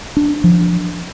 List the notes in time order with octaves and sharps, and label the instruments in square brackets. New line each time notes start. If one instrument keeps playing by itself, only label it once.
[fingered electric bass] D4
F3